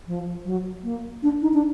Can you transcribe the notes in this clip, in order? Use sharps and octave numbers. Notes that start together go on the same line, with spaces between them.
F3
F#3
A#3
D4
D#4
D4